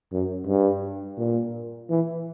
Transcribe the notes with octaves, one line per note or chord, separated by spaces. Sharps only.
F#2
G2
A#2
E3